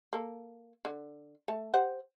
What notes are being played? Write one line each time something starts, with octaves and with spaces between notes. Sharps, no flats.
A#3 A4
D3
A3 A5
G4 C5 F#5